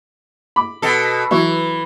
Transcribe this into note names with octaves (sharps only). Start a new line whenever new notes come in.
B5 D6
B2 A4
E3 F#3 E4 C#6